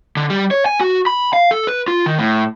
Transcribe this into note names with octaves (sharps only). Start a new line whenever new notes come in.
D3
G3
C#5
G#5
F#4
B5
F5
A4
B4
F4
D#3
A2